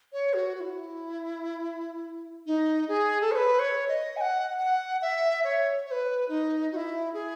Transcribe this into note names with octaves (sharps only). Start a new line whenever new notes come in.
C#5
F#4
F#4
E4
D#4
G#4
A4
C#5
B4
C#5
D#5
G#5
F#5
F#5
E5
C#5
C#5
B4
D#4
F#4
E4
G#4